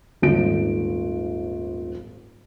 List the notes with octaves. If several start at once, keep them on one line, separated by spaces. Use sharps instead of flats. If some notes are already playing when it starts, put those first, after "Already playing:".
D#1 G#1 D7